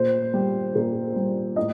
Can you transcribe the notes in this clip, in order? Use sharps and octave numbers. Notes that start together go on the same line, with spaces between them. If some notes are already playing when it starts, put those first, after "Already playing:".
Already playing: A#2 C5
G3
A#2
G3
A2 D#5